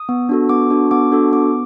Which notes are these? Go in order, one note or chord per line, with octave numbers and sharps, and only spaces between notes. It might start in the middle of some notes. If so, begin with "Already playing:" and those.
Already playing: D#6
B3
D4 F#4 A4
B3 D6
D4 F#4 A4
B3 D6
D4 F#4 A4
B3 D6